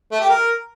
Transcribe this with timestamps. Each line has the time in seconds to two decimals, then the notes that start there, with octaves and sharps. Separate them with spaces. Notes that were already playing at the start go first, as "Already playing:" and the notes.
0.11 A3
0.20 G4
0.29 A#4